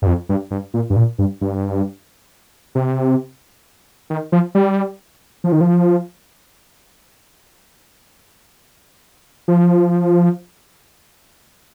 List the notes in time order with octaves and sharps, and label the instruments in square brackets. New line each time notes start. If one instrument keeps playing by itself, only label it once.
[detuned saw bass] G2
F2
G2
G2
A#2
G2
A#2
G2
G2
C3
D#3
F3
G3
F3
D#3
F3
F3